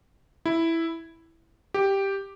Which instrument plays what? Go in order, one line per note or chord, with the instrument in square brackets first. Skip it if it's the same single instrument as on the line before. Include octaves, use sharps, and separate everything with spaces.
[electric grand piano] E4
G4